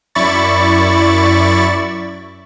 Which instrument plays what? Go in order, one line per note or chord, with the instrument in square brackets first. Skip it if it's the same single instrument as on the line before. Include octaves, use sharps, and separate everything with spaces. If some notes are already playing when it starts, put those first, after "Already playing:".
[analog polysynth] F#2 E4 D5 B5 C#6 A6